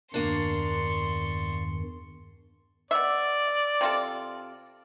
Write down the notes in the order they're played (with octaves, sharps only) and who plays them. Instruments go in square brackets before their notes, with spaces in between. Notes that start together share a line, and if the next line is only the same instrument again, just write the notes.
[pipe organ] E2 G2 D#3 [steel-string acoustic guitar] A#3 D4 [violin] C6 C#6
[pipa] B3 E5 [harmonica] D5
[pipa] C3 F4 A4